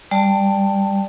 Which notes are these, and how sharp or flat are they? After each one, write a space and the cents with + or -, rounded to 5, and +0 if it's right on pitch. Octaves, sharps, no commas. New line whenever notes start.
G3 +15 D5 +0 A5 +10